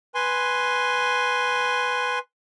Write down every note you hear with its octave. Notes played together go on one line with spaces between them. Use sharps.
B4 G#5 C6